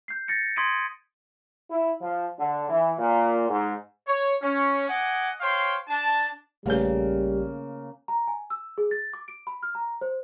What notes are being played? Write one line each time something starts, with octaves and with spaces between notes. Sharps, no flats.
G6 C7
A6 A#6 C#7
C6 D#6 G#6 B6 D7 D#7
E4
F3
D3
E3
A#2
G#2
C#5
C#4
D#5 F#5 G#5 D6
C5 C#5 F5 G5 C6
D4 A5
A#1 C#3 G3 A3 A#3 B4
A#5
G#5
E6
G#4
A6
D6
D7
B5
F6
A#5
C5